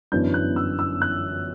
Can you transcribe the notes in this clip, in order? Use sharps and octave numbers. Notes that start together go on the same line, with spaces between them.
G1 F#2 E3 B3 D4 G6
F#6
E6
E6
F#6